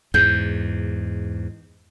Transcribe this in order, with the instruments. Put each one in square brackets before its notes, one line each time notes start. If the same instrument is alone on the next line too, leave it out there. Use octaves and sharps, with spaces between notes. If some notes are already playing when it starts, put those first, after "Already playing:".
[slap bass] E2 G#2 [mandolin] G6